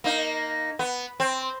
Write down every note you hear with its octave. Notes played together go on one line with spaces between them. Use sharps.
A#3 D#4
B3
C4